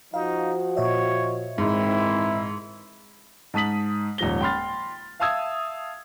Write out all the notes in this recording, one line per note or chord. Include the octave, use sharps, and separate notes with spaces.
F3 D#4 F#4 F5
A#2 C#5 D#5 E5
G#2 D#3 E3 C4 E4
G#2 A5 D#6 B6 F#7
D#1 G#2 F3 A#6 G7
G5 B5 C6 F6 A6
E5 F5 A5 D#6 E6 G#6